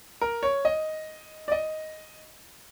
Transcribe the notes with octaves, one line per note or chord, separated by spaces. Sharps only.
A#4
C#5
D#5
D5
D#5